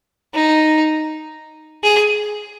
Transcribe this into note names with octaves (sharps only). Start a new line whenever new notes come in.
D#4
G#4